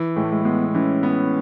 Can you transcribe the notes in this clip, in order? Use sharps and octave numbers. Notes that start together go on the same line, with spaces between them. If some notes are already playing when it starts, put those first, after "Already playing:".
Already playing: E3
A2 G#3
A3
G#3
G#3 B3
E3 C#4
B3